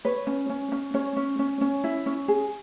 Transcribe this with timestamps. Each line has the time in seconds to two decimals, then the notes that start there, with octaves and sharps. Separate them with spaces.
0.05 B4 C#5
0.27 C#4
0.50 C#4
0.72 C#4
0.94 C#4 C#5
1.17 C#4
1.39 C#4
1.61 C#4
1.84 E4
2.06 C#4
2.28 G#4